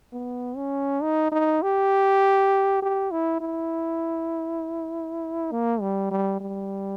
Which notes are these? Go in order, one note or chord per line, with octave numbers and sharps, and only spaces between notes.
B3
C#4
D#4
D#4
G4
G4
E4
E4
A#3
G3
G3
G3